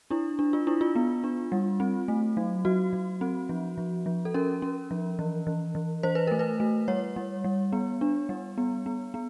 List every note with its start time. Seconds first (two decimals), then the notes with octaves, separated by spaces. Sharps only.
0.11 D4 E4
0.39 D4
0.53 F4
0.67 D4 E4
0.81 F4
0.96 B3
1.24 D4
1.52 G3
1.80 C4
2.08 A3
2.37 F#3
2.65 F#3 F#4
2.93 F#3
3.21 C4
3.49 F3
3.78 F3
4.06 F3
4.25 A4
4.34 C#4 A#4
4.62 C#4
4.91 F3
5.19 E3
5.47 E3
5.75 E3
6.03 E3 C5
6.15 B4
6.27 A3 A#4
6.39 B4
6.60 A3
6.88 G3 C#5
7.16 G3
7.44 G3
7.73 B3
8.01 D4
8.29 G3
8.58 B3
8.86 B3
9.14 B3